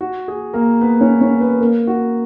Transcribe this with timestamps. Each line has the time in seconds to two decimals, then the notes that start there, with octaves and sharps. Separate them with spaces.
0.01 F#4
0.28 G#4
0.53 A#3 A#4
0.81 B3 B4
1.01 C#4 C#5
1.21 C#4 C#5
1.40 B3 B4
1.61 A#3 A#4
1.87 F#4